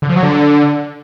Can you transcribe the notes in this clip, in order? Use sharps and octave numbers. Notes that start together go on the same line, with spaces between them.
D3
F3
F#3
D3